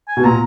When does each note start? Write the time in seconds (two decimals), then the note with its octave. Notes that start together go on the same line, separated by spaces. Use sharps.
0.08 G#5
0.17 B2
0.24 A#2 A#5